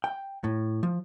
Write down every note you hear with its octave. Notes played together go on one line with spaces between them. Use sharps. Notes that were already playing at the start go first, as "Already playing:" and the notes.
G5
A2
F3